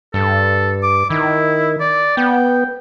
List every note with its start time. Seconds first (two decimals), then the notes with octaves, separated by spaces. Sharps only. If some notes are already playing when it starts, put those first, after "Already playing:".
0.14 G2 A4
0.83 D6
1.10 D#3 E4
1.80 D5
2.17 B3 G5